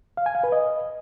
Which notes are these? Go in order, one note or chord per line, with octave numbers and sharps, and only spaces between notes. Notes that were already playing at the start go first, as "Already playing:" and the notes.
F5
G#5
F5
B4
D#5